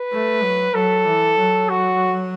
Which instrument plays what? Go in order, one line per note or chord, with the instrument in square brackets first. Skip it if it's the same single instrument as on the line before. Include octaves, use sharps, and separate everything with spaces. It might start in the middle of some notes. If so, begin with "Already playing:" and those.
Already playing: [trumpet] B4
[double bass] A3
F#3
[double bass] F#3 [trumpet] A4
[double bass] E3
F#3
[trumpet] F#4